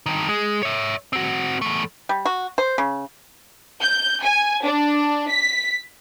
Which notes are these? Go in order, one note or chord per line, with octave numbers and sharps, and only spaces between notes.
G2 D#3
G#3
C#5 E5
C4 F#4
E2 A3
G3
F#4
C5
C#3
G6
G#5
D4
B6